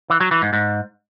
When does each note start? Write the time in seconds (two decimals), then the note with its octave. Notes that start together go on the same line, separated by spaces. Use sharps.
0.10 E3
0.21 F#3
0.31 E3
0.42 G#2
0.53 G#2